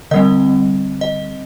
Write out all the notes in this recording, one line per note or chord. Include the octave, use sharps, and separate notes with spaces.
D3 G3 C4 D#5
D#5